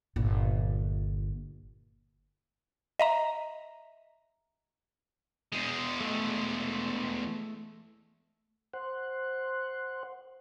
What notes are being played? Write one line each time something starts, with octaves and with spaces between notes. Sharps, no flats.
G1 A#2
D#5 E5 A#5
E2 G#3
A3
C5 F#5